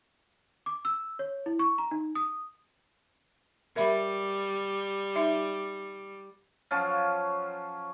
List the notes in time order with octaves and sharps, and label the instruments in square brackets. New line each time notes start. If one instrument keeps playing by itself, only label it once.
[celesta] D6
E6
C#5
E4
C#6
A#5
D#4
D#6
[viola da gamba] G3 [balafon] A#4 E5 B5
[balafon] D#4 E5
[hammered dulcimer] F3 F#3 C#4 F4